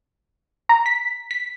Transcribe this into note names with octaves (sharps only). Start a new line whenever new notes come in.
A#5
B6
B6